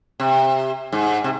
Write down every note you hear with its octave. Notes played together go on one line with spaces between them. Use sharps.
C3
G#2
C3